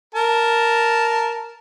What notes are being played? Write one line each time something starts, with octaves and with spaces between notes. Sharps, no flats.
A#4 A5